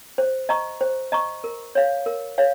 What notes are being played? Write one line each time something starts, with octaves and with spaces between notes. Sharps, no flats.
C5
D#5 A#5 C#6
C5
D#5 A#5 C#6
A#4
C#5 F5
A#4
C#5 F5